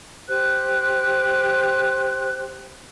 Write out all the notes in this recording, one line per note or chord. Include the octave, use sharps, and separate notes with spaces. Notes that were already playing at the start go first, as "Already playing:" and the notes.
G4 C5 F#6